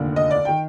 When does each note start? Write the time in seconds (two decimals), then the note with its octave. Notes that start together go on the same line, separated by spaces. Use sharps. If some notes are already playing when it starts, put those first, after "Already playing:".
Already playing: F1 D#2 D3
0.16 D#5
0.31 D5
0.45 D#3 G5